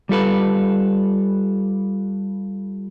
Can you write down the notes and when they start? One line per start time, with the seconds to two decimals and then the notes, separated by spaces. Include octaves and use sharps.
0.09 G3 F4 A4 B4